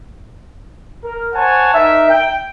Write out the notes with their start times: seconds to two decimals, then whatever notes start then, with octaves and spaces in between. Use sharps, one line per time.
1.03 A#4
1.33 C5 C#5 F#5 G#5 A5
1.74 D#4 A#4 E5
2.10 G5